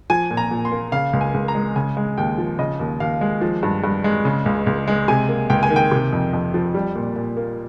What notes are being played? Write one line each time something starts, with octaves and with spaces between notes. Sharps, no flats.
F3 G#5
A#2
A#5
A#2
C6
A#3
C#3 F5
C#2
G#5
C#2
A#5
G#3
C#3 G#5
G#3
D#2 G5
F3
C#3 D#5
D#2
D#2 F5
G#3
F3
G2
G2
G#3
C#3
C#2
C#2
G#3
C3 G#5
A#3
C#2 G5
G#5
D#3
G5
C3
F2
F2
F3
G3
A#2
A#2
A#3